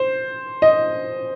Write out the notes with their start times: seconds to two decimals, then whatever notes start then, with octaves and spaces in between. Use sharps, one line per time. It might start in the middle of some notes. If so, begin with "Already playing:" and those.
Already playing: C5
0.62 D#5